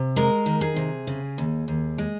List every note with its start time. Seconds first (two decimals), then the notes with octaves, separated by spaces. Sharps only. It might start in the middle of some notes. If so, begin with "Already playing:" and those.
Already playing: C3
0.16 G#3 A#4
0.46 D#3
0.61 G#4
0.76 C3
1.07 C#3
1.38 D#2
1.68 D#2
1.98 G#3